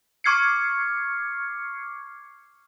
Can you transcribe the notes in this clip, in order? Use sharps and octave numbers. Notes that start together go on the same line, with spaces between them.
C#6 D6 F6 G#6 C7 C#7